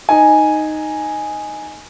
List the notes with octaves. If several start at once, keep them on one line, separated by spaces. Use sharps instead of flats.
D#4 G#5